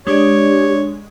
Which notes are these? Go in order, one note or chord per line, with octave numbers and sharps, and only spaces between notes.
G#3 D4 G4 C#5 D5